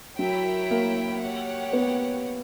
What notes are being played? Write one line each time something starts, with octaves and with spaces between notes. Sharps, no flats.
F#3 E4 A#4 C#5 E5 G5
A#3
G4 C#5 F#5
B3